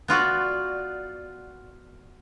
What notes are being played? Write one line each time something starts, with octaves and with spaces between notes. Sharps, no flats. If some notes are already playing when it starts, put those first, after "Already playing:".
B3 F4 F#4 D5